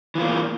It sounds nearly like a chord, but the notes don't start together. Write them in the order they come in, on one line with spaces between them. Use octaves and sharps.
E3 F4 A#3